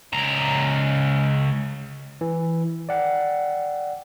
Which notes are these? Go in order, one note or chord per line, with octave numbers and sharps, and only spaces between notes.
C#2 A#5
E3
D5 F#5 G5